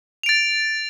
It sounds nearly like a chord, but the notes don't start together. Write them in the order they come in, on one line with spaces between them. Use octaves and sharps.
F7 D7 A6